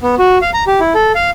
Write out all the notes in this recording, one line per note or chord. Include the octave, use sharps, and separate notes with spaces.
B3
F#4
F5
A#5
G4
E4
A4
F5